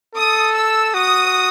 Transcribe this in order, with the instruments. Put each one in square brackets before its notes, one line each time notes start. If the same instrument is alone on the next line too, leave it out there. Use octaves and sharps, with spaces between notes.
[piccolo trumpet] A4 [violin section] D#6
[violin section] E6
[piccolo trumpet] F#4 [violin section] D#6